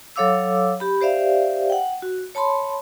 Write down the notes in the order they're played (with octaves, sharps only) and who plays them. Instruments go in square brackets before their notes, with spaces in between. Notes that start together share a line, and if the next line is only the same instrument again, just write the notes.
[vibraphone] F#3 A4 C#5 F5 D6 E6
G4 B5
G4 C5 D5 E5 F5
F#5 G5
F#4
C#5 A5 B5 C6